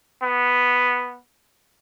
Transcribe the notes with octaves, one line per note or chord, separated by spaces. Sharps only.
B3